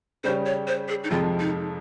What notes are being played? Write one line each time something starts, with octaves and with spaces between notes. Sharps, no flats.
C#3 G3 C#4 G4 C5
C#5
C5
G#4
D#4
F2 C3 F3 G#3 C4 F4
D#4